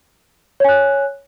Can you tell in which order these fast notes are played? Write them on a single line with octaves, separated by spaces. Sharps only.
C#5 G#5 F#6